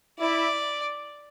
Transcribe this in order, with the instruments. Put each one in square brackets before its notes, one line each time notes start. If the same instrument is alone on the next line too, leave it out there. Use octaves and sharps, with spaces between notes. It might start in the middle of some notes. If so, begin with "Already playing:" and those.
[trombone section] E4 [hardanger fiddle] D5